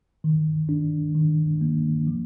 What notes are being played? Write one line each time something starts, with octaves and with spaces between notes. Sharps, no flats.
D#3
D4
D#3
A#3
F3